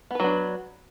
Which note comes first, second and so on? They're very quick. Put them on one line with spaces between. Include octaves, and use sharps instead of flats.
B3 B4 F#3 D4